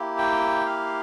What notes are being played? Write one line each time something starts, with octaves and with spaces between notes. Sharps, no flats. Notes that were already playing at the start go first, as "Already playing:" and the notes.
Already playing: A#3 E4 G4
G5
F5